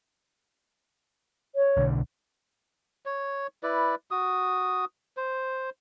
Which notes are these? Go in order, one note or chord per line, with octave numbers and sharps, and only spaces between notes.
C#5
B1 D3
C#5
E4 B4 D5
F#4 D#6
C5